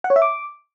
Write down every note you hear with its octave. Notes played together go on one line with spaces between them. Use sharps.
F#5
C#5
E5
D6